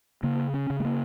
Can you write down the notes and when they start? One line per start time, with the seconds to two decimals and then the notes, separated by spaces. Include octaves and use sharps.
0.23 C#3 A#3
0.54 C#4
0.70 C#3
0.80 A3
0.85 A#3